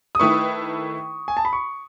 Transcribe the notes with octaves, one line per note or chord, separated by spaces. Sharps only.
D#6
D#3 A3 E4 B4 C#6
G#5
A5
B5
C#6